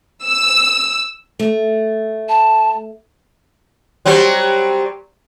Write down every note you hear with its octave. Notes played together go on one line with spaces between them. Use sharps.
E6
A3
A5
F#3 G3 C4